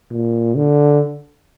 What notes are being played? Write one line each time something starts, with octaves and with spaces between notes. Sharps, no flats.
A#2
D3